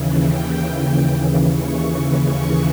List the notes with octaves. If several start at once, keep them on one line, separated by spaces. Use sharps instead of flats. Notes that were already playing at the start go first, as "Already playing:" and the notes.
Already playing: D#2 C#3 E3
G5
C#6
C#6